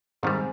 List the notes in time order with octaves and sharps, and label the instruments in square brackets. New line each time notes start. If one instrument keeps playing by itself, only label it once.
[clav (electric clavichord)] G#2 D#3 G3 [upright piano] G#3 C4